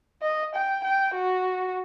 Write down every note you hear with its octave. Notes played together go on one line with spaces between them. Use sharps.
D#5
G5
G5
F#4